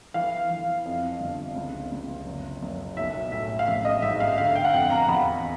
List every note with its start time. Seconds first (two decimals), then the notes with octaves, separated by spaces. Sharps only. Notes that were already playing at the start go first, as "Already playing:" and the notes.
0.14 E3 F5
0.50 E3
0.85 F2
1.21 G1
1.56 C#2
1.91 C#2
2.26 F#1
2.62 F#1
2.97 B1 E5
3.32 A2 E5
3.59 F5
3.67 A1 E5
3.85 D#5
4.02 G#2 E5
4.20 F5
4.38 D3 F5
4.55 G5
4.65 F#5
4.73 F2 G5
4.90 A#5
5.08 E2 B5